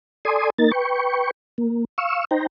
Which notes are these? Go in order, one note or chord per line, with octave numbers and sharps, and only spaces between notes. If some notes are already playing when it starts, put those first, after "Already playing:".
A4 D5 G#5 C6 D#6
A#3 D#4 A#4 A6
B4 G5 C#6
A#3
F5 C#6 E6
D#4 C5 G5 A#5